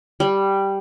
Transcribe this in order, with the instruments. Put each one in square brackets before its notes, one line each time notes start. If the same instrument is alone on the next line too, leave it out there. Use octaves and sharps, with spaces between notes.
[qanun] G3